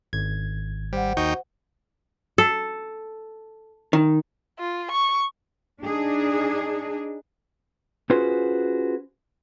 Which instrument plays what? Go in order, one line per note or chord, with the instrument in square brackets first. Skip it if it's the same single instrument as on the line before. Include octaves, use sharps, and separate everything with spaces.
[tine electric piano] G#1 G#6
[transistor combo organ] G3 [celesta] C5 F#5
[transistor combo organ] D#2 D#4 G5 [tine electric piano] F#4 C#6
[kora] A4
[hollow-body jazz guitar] D#3
[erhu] F4
C#6
[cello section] D4 D#4 G#4
[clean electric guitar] C#4 F4 F#4 G#4 B4 C5